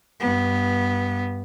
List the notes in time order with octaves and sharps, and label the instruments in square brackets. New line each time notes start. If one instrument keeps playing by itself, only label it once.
[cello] G2 B3